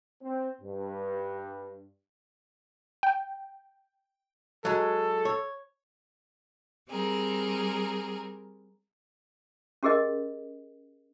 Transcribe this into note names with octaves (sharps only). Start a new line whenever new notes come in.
C4
G2
G5
F#3 G#3 A4
C#5
G3 C4 G#4 A#4
C#4 G4 G#4 A#4 D#5